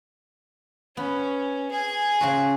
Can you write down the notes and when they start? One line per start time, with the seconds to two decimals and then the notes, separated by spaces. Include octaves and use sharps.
0.97 B3 C#4
1.71 G#4 G#5
2.21 C#3 F4 F#4